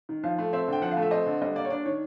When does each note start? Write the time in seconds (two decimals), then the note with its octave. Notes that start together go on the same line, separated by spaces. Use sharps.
0.09 D#3
0.24 F3 F5
0.38 A3
0.53 C4 E5
0.68 D3 G5
0.82 F3 F#5
0.91 F5
0.97 A3
1.02 E5
1.11 C4 D#5
1.26 D3
1.42 G3 D#5
1.55 A#3 D5
1.65 C#5
1.70 D4 D5
1.85 D#3 C#5